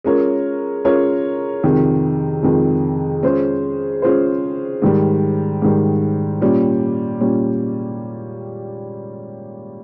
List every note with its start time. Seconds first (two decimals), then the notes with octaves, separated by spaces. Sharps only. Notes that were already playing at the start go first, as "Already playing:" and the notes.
0.04 G#3 C#4 F4 A#4 C#5
0.84 G#3 C#4 F4 A#4 C#5
1.63 F2 C3 D#3 G#3
2.43 F2 C3 D#3 G#3
3.23 G#3 C#4 F4 G#4 C5
4.02 G#3 C#4 F4 G#4 C5
4.82 G#2 D#3 G3
5.62 G#2 D#3 G3
6.41 A#2 G3 C#4
7.21 A#2 G3 C#4